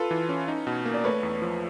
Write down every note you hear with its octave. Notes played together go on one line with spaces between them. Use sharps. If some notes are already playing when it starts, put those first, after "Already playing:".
Already playing: F4 A4 B4
E3
C#4
D#4
B2
A#3
D5
A3 B4 C#5
E2
F3